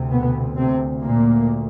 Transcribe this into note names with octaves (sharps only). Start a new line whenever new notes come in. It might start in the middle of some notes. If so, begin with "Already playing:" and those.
Already playing: D2 C3
B2 B3
C3 C4
A#2 A#3